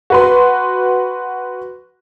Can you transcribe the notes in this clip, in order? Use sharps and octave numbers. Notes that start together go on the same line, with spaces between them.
F#4 B4 C6